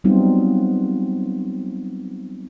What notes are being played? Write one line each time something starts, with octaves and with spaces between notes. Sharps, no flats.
F#3 G3 B3 C4 D#4 F4